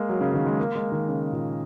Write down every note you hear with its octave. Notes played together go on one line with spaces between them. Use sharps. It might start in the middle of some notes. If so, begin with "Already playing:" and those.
Already playing: G#3 A#3
F#3
C#3
D#3
G#3
A#3
G#3
D#3
C#3
A#2